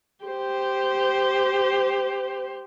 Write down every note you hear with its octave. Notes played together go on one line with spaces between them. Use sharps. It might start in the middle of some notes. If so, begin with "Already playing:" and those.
G4 C5